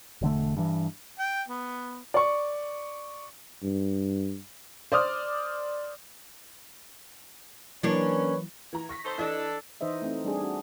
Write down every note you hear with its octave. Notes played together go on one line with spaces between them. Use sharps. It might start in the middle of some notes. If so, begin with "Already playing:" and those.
E1 D3 A3
G2 E3
G5
B3
D5 C#6
G2
C5 D5 D6 D#6 F6
E3 F#3 A#3 C#4 D4 E4 B4 C#5
E3 A#5
C#6 A#6 B6
D#4 A4 C5
E3 D4 A4 D#5
E3 D#4 C5 D#5 E5
A3 C4 D#4
G3 D4 G#4
D4 F#4